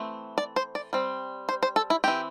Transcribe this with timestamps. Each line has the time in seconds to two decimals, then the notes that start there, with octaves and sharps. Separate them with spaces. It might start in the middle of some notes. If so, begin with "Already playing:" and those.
Already playing: E3 A3 C4
0.38 D5
0.56 C5
0.75 D5
0.93 G3 C4
1.49 C5
1.63 C5
1.76 A4
1.90 E4
2.04 E3 C4 G4